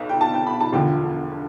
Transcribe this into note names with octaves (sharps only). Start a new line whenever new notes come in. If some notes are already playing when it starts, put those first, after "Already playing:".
Already playing: B1 B2
G5
A5
G5
B5
A5
E1 D2 D3 F3 G5